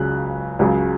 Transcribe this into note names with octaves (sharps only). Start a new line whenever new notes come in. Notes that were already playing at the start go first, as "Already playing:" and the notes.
Already playing: C#2 C#3 F#3 F#6
C#2 C#3 F#3